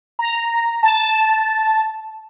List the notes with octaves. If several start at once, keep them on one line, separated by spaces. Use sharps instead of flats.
A#5
A5